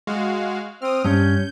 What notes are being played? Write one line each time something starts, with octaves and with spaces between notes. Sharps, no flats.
G#3 F#4 F5
C4 D#6 F6
G2 C#4 G6